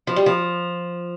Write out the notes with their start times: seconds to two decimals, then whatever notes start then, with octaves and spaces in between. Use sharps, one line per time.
0.07 F3
0.16 G3
0.26 F3